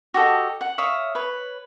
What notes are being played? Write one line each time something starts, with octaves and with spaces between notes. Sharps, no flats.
F#4 G4 A4 D#5
F#5
C#5 E5 F5 D#6
B4 C#5